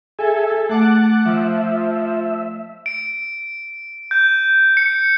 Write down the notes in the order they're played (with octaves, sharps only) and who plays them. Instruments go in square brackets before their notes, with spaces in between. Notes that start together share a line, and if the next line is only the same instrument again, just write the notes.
[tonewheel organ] G#4 E5 G#5 [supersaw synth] A4
[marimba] A3 [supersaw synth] F#5 D6 F#6 [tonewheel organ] A5
[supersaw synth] F3 [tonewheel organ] E5
[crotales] D7
G6
C#7